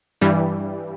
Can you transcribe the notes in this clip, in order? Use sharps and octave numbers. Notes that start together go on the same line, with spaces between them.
G2 E3 G3